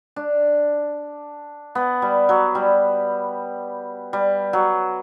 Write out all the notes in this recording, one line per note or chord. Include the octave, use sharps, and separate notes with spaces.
D4
B3
G3
F#3
G3
G3
F#3